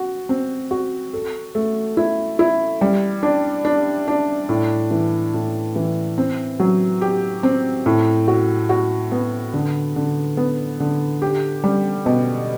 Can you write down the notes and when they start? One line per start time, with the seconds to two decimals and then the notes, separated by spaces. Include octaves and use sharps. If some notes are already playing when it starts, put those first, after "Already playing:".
Already playing: F#4
0.29 C4
0.71 F#4
1.13 A4
1.55 A3
1.97 E4
2.39 E4
2.81 G3
3.23 D4
3.65 D4
4.08 D4
4.49 A2
4.91 E3
5.34 A2
5.76 E3
6.18 C4
6.60 F#3
7.02 G4
7.43 C4
7.86 A2
8.28 F#4
8.69 F#4
9.12 B3
9.53 D3
9.96 D3
10.37 B3
10.80 D3
11.22 G4
11.64 G3
12.06 B2